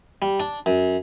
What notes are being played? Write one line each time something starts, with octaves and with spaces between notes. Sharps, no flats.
G3
D4
F#2